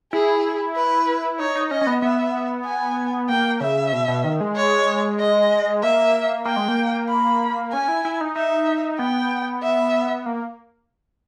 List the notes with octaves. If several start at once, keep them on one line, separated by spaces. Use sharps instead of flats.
E4 G#4
B4
D#4 C#5
D#4
C#4 D#5
C#4
B3
B3 E5
G#5
A#3 G5
C#3 E5
B2
B2
D#3
G#3
C#5
D#5
A#3 E5
A#3 G5
G#3
A#3
B5
C#4 G#5
E4
E4
D#4
D#4 E5
B3 G5
E5
A#3